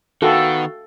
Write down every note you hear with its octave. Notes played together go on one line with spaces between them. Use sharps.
D#3 B3 F#4 A4 F5 G5